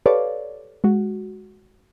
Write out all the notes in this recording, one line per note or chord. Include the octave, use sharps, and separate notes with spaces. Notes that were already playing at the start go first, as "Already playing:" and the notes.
G4 A4 B4 C#5 D5 F5
G#3 F#4